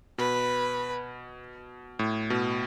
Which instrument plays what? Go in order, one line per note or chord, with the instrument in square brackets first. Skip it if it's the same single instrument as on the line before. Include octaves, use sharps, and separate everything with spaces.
[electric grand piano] B2 [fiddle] B4
[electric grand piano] A2
B2